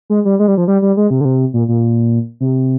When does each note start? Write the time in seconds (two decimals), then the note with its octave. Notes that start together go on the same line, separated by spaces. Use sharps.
0.10 G#3
0.25 G3
0.39 G#3
0.48 G3
0.57 F3
0.68 G3
0.82 G3
0.97 G#3
1.10 C3
1.21 D3
1.25 C3
1.54 A#2
1.68 A#2
2.40 C3